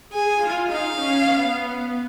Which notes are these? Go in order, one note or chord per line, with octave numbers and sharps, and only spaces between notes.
G#4 G#5
F4
D#4 F5
C#4
B3